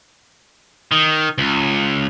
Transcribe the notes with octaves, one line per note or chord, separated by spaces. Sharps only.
D#3
C#2